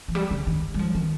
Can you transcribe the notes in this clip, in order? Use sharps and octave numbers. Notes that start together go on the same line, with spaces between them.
F3
G3
D3
D#3
G3
F3
D#3